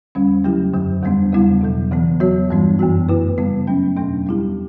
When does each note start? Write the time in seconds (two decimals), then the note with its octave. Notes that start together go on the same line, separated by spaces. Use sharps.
0.15 E2 D3 G3 C#4
0.44 C#3 F#3 A3 E4 G4
0.73 F#2 D3 F#3
1.03 E2 D3 G3 B3 D4
1.32 E2 C#3 G3 B3 E4
1.61 E2 B2 F#3
1.91 E2 C#3 E3 B3
2.20 F#3 B3 F#4 C#5
2.50 G2 E3 G3 B3 D4
2.79 F#2 E3 B3 F#4
3.09 F#2 D3 A3 E4 B4
3.38 C#3 G3 B3
3.67 F#3 A3 C#4
3.97 E2 B2 F#3 A3 D4
4.26 G3 B3 E4 G4